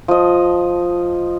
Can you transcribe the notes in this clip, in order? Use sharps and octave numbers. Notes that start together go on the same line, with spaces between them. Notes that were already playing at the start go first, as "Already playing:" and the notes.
F3 D#5